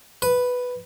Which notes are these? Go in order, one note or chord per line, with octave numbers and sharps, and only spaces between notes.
B4